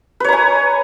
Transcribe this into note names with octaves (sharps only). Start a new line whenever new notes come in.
B4 C#5 G#5 A#5